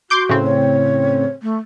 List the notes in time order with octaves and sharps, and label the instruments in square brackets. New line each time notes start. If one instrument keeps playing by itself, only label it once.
[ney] F#4 [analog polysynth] C6 D6 G6
[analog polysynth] A2 C#3 C4
[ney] C#5
A3